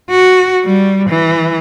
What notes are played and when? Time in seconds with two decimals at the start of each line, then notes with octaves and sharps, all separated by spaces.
0.10 F#4
0.65 G3
1.10 E3